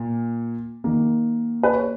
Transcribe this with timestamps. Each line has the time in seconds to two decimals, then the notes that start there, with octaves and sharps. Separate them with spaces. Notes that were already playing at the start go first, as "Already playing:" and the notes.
Already playing: A#2 A#3
0.84 D#3 A#3
1.63 B4
1.73 C#5